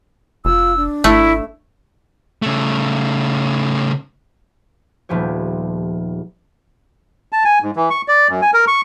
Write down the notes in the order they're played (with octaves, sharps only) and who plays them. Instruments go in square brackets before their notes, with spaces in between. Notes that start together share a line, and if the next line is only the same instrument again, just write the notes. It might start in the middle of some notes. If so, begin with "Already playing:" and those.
[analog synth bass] F1 [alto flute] F4 [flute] E6
[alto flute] D4
[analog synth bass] G#1 [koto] A3 [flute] E4
[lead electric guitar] C#3 A3
[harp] D#1 F3 B3 G4 C#5
[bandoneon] A5
G#5
G#2
E3
C#6
D5
F#2
G#5
A#4
C#6